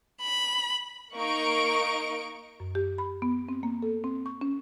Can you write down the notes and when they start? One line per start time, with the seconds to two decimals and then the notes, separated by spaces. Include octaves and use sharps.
0.22 B5
1.14 A#3 D#4 C#6 D7
2.60 F#2
2.75 G4
2.98 B5
3.22 B3
3.49 C4
3.63 A#3
3.83 A4
4.04 C4
4.26 C#6
4.41 C#4